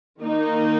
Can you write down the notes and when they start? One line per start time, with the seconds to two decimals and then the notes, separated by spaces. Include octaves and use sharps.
0.22 D#3 A#3 D#4